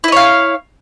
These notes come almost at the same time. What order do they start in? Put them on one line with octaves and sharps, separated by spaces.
E4 D#5 C#5 F5